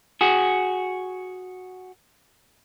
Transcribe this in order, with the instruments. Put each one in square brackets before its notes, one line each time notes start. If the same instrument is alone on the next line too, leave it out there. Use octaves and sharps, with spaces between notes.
[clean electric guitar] F#4 G#4